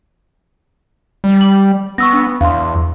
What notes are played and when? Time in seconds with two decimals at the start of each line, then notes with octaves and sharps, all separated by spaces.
1.24 G3
1.41 F#7
1.98 B3 C#6 E6 A#6
2.13 D4
2.41 E2 F5 C6